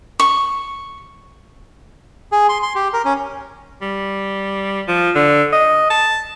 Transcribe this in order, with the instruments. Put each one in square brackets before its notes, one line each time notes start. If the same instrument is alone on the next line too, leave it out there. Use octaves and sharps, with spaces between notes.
[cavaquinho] C#6
[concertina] G#4
C6
C6
G4
A#4
C#4
[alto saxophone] G3
F3
D3
D#5
A5